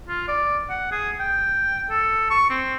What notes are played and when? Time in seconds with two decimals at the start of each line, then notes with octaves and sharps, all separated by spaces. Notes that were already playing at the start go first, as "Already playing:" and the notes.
0.09 F4
0.28 D5
0.70 F#5
0.91 G#4
1.20 G5
1.90 A4
2.30 C#6
2.50 C4